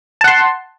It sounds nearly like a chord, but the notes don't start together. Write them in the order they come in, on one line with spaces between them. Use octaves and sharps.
A5 F#5 C6